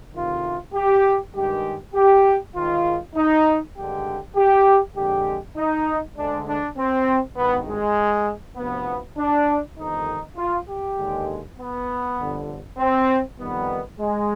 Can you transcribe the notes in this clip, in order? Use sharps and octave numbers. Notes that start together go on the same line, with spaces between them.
D2 C3 D#3 F4
G4
G2 D#3 G#3 G4
G4
G#1 G#2 D#3 F4
D#4
G#1 G2 D3 G#3 G4
G4
F2 D3 G#3 G4
D#4
D2 D3 G#3 D4
D4
C4
G#1 G2 D#3 B3
G#3
D2 C3 F3 B3
D4
G1 F2 D#3 D#4
F4
G4
D#2 D3 G#3
B3
G1 F2 D3
C4
F2 D#3 G3 B3
G#3